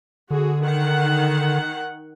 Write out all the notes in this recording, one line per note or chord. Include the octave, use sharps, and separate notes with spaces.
D3 F#4 G#4
D#3 F#5